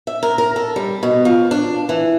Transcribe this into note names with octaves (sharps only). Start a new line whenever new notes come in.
E5
A#4
A#4
A4
G3
B2
F3
D4
E3